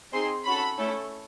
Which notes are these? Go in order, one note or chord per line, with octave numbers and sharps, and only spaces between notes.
C4 D#4 G#4 C6
C#4 F#4 A4 B5
A3 C#4 E4 A4